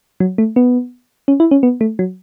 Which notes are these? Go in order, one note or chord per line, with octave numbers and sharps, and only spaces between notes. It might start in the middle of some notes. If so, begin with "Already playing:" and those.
F#3
A3
B3
C#4
E4
C#4
B3
A3
F#3